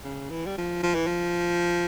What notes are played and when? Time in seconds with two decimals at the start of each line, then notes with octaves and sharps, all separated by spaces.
0.04 C#3
0.30 E3
0.46 G3
0.58 F3
0.83 F3
0.95 E3
1.07 F3